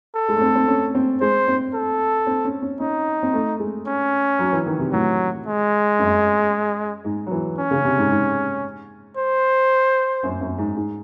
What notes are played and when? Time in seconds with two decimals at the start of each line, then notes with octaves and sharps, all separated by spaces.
0.15 A4
0.28 G#3
0.36 A3
0.41 C4
0.55 C4
0.68 C#4
0.95 C4
1.21 G#3 C5
1.48 C4
1.74 A4
2.27 C4
2.45 C#4
2.62 C#4
2.80 C#4 D#4
3.23 C4
3.33 A3
3.60 G#3
3.87 C#4
4.39 F#3
4.53 E3
4.66 D#3
4.79 C3
4.92 A2 F#3
5.46 G#3
5.99 F#2
7.04 G#2
7.27 F#3
7.31 E3
7.58 C#4
7.71 C#3
7.85 C3
7.98 G#2
8.11 G#2
9.17 C5
10.23 F#2
10.41 F#2
10.58 G#2
10.76 G#2